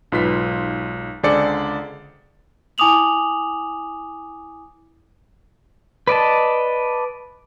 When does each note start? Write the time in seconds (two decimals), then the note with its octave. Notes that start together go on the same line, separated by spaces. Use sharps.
0.12 B1 G#2 F4 B4 B6
1.23 C#2 D3 G#4 C5 D5 C#7
2.78 E4 G#5 D6 D#6 F7 F#7
6.07 B4 D5 D#5 A5